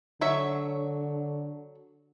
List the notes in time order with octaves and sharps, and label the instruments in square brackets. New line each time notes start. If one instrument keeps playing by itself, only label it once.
[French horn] D3 [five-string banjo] F#3 C#5 E5